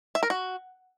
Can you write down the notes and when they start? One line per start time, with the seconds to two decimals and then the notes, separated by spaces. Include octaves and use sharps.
0.15 E5
0.23 A#4
0.30 F#4